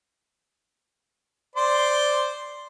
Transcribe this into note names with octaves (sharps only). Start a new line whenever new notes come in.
C5 D5 C6